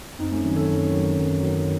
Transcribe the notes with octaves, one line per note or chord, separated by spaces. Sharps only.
F#2 C4 D#4
A3 C#4
D#3 F#3
A4 C#5
F#2
D#3 F#3
F#2
D#3 F#3